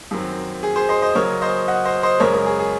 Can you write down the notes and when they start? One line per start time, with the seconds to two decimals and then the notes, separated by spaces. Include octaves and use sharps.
0.11 F#2 D#3 F#3 C4
0.63 G#4
0.76 G#4 C5
0.89 C5 D#5
1.02 C5 D#5
1.15 C#3 F#3 C#4 A#4 C#5
1.41 C5 D#5
1.68 D#5 F#5
1.85 C5 D#5
2.03 C5 D#5
2.20 F#2 C#3 G#3 A#4 C#5
2.33 A#4
2.46 G#4
2.59 G#4